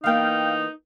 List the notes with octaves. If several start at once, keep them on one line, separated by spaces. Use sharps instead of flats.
E3 A#3 B3 D#4 F5 G5